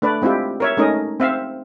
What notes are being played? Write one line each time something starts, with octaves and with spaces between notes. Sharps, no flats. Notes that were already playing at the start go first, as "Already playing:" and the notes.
A3 D4 B4 D5
G#3 C4 E4 F4 G4
A#4 C#5 E5
G#3 A3 C#4 D#4 A#4 D#5
C4 E5 F5